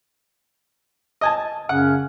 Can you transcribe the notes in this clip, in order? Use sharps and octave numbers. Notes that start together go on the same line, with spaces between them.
D#5 G#5 A5
F#2 C#3 C#4 F#5